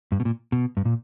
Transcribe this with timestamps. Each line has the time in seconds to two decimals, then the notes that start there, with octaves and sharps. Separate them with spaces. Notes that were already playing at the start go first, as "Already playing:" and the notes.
0.12 G2
0.20 B2
0.25 A#2
0.52 B2
0.77 G2
0.85 A#2